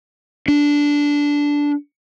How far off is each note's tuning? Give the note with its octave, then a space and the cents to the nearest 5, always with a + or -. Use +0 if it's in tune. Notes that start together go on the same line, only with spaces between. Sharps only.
D4 -10